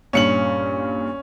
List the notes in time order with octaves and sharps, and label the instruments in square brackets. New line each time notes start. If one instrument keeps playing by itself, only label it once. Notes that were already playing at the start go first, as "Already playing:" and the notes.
[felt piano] G2 A#2 [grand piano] C#4 C#7 F#7